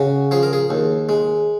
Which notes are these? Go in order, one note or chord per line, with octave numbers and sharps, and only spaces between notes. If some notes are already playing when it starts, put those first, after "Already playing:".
Already playing: C#3 F#4
F3 G#4
A#4
G#4
D#2
G#3